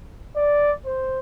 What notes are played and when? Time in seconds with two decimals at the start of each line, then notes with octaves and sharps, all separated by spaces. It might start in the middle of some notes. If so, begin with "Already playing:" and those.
0.36 D5
0.86 C5